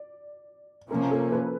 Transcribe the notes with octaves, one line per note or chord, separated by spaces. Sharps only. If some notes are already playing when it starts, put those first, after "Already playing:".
Already playing: D5
C3 F3 A#3 C#4 A#4
A4
B4